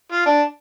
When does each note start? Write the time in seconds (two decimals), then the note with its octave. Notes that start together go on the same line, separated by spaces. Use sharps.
0.12 F4
0.26 D4